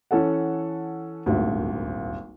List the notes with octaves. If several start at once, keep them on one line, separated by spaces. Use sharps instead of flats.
E3 C#4 A4 F#5
D#1 G#1 D2